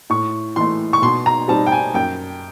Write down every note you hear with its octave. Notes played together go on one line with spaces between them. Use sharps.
A2 C#6
E3 A3 C6
C#6
B2 C6
A#5
G3 C4 D#4 A5
G5
G#5
F#2 G5